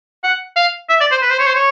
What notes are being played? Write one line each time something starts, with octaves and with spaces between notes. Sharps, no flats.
F#5
F5
E5
D5
C5
B4
C5
C#5
C5
C#5